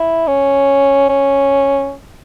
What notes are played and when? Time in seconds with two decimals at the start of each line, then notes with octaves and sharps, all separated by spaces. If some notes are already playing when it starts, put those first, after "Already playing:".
Already playing: E4
0.27 C#4
1.09 C#4